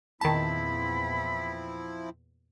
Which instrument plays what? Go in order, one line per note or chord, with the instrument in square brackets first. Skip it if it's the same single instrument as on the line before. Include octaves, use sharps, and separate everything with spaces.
[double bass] E2 A#2 [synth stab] D#3 A5 [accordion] F3 C4 E4 [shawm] B5